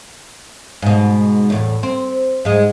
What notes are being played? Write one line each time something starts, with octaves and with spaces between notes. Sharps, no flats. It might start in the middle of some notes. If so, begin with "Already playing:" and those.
G#2 B2
E2 A2
C4
G#2 G#3